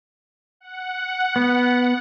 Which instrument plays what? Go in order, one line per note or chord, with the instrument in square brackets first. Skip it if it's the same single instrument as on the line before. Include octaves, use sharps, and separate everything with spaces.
[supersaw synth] F#5
[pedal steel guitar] B3